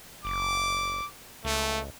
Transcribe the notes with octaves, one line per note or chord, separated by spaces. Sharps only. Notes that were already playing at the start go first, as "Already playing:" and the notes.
F#1 D6
C#2 A3